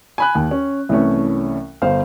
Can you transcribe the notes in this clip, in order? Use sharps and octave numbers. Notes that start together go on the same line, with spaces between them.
G#5 B5 F#6
D#2
C#4
C2 E3 A3 C#4
G1 C5 F5